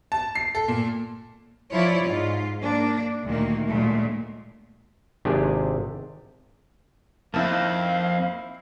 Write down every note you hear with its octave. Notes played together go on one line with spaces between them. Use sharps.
A5
C7
A4
A#2
F3 E4 F4 C#5 D5
G#2 F4
A#3 D4
D2 A#2 D#3 A#3
A#2 D3 F#3 G#3 A3
G#1 C3 D4 G4 G#4
F2 A#3 C4 D#4 E4 F5 A5